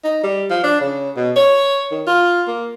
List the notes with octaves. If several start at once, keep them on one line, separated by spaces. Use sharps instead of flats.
D#4
G3
F3
D4
C#3
B2
C#5
D#3
F4
A#3